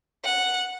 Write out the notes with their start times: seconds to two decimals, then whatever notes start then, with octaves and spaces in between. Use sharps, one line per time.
0.24 F#5